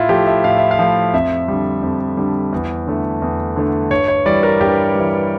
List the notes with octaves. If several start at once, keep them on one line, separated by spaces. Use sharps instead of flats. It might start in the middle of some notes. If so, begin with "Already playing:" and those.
Already playing: A2 E4 F4
F3 A3 G4
E5
A2 F5
E5
F5
F3 A3
F2 E5
D3 G3
F2
D3 G3
E2
D3 A3
E2
D3 A3
G2 C#5
C#5
E3 G3 D5
A#4
G2 G4
E3 G3